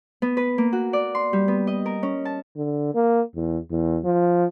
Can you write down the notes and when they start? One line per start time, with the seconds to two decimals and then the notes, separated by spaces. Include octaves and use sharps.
0.22 B3
0.37 B4
0.58 A#3
0.73 F#4
0.93 D5
1.15 C6
1.33 G3
1.48 B3
1.67 D#5
1.86 A#4
2.03 C#4
2.25 A5
2.56 D3
2.94 A#3
3.35 E2
3.70 E2
4.04 F3